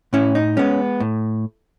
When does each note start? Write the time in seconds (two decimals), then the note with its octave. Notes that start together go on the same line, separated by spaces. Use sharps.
0.13 A2 C#4 E4
0.35 D#4
0.57 G#3 B3 C#4
1.00 A2